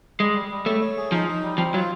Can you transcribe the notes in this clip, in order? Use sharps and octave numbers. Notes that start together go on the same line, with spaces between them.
G3 G#3
G3
G3
A3 C#5
C#5
G#4
F3 D#4
D#4
G3
F3 C4
F#3 F4